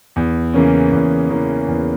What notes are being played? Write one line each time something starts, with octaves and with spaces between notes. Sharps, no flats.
E2
C#3 E3 A#3 C#4
E2
C#3 E3 A#3 C#4
E2